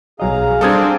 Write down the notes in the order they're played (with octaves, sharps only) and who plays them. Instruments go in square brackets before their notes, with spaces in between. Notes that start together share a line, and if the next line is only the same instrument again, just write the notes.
[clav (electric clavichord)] B1 F#3 D#5 [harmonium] G#4 F5 A#5
[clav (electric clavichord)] G3 [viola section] C4 D4 [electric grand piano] A4 D#6 G#6